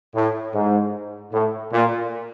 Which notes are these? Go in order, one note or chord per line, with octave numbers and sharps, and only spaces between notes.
A2
G#2
A2
A#2